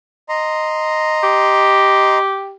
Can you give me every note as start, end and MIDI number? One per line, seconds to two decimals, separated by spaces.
0.29 2.18 75
0.29 2.18 82
0.29 2.18 84
1.23 2.55 67